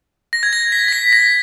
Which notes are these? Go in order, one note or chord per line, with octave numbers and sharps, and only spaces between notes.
A#6
G#6
A#6
B6
A#6
B6
A#6